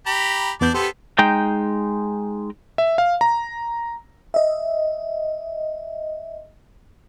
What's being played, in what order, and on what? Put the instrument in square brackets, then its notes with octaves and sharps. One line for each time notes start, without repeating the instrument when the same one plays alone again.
[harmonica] G4 A#5 B5
[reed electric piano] E2 B3 G6 [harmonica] D4 D5
[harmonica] B3 A4 C5 [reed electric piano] G4
[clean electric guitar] G#3 D#4 G5
[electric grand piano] E5
F5
A#5
[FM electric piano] D#5 E5